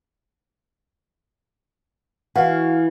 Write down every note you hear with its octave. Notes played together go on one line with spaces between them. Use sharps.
E3 F#4 F5